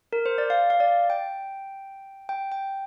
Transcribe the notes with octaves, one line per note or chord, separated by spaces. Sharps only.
A#4
C5
D5
F5
F5
D5
G5
G5
G5